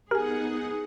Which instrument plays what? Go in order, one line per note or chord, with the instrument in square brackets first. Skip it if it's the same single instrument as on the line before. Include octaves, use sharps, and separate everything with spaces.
[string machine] B3 D#4 F#5 [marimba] G4 G#5 [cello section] G#4 [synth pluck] A#4